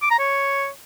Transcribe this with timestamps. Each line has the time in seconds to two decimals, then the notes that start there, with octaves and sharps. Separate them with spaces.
0.02 D6
0.11 A#5
0.19 C#5